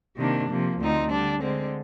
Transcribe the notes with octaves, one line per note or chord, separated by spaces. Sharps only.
C3 D#3 A#3 D4
C3 F3 A#3
D2 D3 F3 C4 D#4
D3 G3 D4
D3 G#3 C4